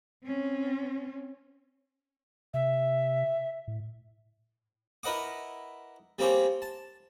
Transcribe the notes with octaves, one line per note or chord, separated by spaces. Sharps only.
C4 C#4
C3 E5
A2
E4 A#4 B4 D#5 F#5 D6
G3 A#3 C4 G4 G#4 C#5
A5